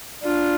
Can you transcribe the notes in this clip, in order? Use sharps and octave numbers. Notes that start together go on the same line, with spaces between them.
D4 F4